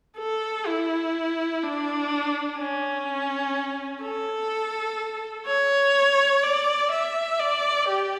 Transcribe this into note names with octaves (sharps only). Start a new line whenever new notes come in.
A4
E4
D4
C#4
A4
C#5
D5
E5
D5
G4